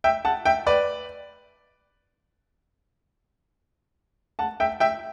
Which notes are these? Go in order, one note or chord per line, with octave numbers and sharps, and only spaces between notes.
E5 G5
F#5 A5
E5 G5
B4 D5
F#5 A5
E5 G5
E5 G5